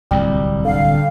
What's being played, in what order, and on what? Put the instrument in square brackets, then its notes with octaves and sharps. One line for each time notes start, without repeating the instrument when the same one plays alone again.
[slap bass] D1 C2 [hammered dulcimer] G3
[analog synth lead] D3 [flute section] F5